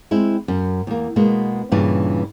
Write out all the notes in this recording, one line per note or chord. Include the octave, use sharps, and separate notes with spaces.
G#3 C4 E4
F#2
E2 A#3
B2 G#3 A#3 B3
G2 A#2 C#3 E3 E4 B4